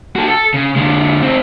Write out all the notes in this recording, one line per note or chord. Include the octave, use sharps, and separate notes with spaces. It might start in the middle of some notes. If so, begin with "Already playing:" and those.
F#4 A4
A4
C#3
D3 G#3
C4 D#4